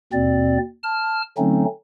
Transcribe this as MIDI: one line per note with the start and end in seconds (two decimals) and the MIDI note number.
0.13 0.58 39
0.13 0.58 47
0.13 0.58 60
0.13 0.58 74
0.83 1.21 81
0.83 1.21 89
1.38 1.65 50
1.38 1.65 54
1.38 1.65 57
1.38 1.65 60
1.38 1.65 61
1.38 1.65 63